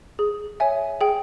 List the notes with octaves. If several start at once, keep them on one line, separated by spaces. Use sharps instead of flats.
G#4
C#5 E5 G#5
G#4 G5